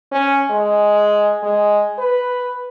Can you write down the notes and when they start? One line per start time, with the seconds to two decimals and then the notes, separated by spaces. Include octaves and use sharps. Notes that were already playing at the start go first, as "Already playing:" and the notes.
0.12 C#4
0.50 G#3
1.43 G#3
1.98 B4